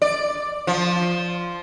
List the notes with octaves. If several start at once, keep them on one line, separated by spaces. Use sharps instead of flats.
D5
F3